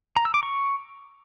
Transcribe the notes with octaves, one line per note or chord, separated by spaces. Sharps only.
A#5
E6
D6
C#6